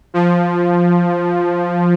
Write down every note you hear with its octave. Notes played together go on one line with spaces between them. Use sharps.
F3